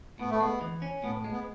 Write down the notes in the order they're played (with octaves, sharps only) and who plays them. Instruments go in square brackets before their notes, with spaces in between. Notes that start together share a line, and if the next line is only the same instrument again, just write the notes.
[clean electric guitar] A2 [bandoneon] B3
[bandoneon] A3
[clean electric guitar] G#3 [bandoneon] B3
[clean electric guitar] E3
C#4
[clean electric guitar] A2 [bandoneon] B3
[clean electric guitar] G#3
[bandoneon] B3